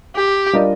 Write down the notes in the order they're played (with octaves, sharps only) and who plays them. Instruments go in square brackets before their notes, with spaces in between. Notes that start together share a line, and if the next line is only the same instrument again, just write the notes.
[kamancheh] G4
[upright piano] G3 D4 F4 A#4 D#5